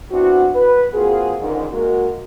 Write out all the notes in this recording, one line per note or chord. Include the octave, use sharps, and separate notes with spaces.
B3 C4 D4 E4 F#4
B4
A#3 C4 F4 F#4 G#4
C#2 G#2 D3 D#3
G#3 A#3 F#4 A#4